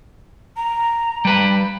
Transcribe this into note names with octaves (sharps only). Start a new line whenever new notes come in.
A#5
G3 B4